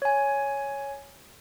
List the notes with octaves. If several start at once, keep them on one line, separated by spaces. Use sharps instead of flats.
C#5 G#5